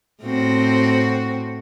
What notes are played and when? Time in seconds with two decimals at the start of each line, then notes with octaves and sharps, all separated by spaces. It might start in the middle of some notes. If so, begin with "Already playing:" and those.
0.23 A2 C4 F#4